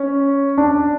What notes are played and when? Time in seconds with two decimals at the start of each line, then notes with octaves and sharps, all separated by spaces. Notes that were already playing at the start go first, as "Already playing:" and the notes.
Already playing: C#4
0.58 D4